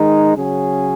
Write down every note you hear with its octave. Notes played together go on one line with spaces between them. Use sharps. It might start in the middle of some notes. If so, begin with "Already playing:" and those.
Already playing: D#3 G#3 D#4
C#3 F#3 C#4 G#4